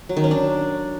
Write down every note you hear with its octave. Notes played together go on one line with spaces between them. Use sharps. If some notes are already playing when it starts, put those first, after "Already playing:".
F#3
D#3
C#4
D4